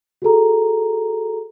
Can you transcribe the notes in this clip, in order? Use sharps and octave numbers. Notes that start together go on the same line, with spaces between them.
F#4 G#4 A4 A#5